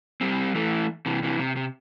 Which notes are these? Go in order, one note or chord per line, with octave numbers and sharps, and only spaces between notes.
G3 C4
E3 A3
C3 E3
C3 E3
C3
C3